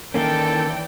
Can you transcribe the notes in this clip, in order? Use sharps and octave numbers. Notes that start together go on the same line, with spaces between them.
D#3 E3 A#3 C#4 A4 D5 G5